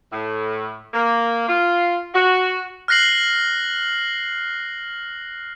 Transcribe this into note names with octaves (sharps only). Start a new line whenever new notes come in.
A2
A#3
F4
F#4
F6 F#6 A#6 C7 F#7